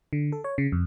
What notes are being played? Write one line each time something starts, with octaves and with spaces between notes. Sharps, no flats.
D3
A4
C#5
C#3
F2